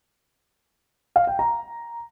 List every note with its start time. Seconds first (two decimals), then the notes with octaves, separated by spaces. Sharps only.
1.16 F5
1.27 G5
1.39 A#5